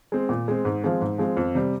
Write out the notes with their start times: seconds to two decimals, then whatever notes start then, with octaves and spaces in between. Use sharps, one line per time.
0.12 G#3 C4
0.29 A#2
0.48 G#3 C4
0.65 G#2
0.84 F3 G#3 C4
1.02 G#2
1.18 F3 G#3 C4
1.37 F2
1.55 C3 G3